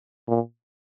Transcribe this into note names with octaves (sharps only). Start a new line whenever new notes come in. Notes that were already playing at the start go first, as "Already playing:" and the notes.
A#2